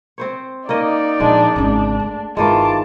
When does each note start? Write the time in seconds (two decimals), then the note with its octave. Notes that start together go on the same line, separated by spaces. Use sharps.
0.18 C4 C5 C#5
0.69 A#3 C#4 D#4 D5 D#5
1.20 A#2 F3 G#3 D4
1.56 G#1 C#3 D4
2.00 A3
2.37 G1 D#3 E3 G#3 F4 A5 D6